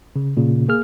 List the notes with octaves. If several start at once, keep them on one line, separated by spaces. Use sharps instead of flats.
C#3
A#2 C#3
A#3 G#4 F6